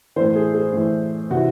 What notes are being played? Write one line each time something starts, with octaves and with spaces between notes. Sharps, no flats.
A2 E3 C5
G#4
G#4
A2 E3
C3 E3 F#4